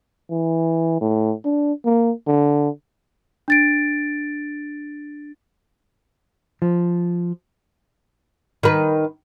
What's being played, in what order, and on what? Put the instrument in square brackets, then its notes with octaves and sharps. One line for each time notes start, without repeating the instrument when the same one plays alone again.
[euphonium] E3
A2
D4
A#3
D3
[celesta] D4 A6 D7
[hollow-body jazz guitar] F3
[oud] D#3 B4